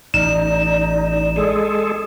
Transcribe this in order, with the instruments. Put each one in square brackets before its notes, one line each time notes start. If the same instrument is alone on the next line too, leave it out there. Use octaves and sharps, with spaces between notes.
[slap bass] A1 [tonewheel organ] D#4 [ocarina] D5 [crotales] E7
[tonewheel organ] G#3 G#4 A4